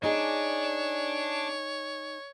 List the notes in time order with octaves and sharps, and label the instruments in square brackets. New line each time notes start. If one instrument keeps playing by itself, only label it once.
[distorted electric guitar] D4 [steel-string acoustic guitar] D#4 G#4 [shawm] C#5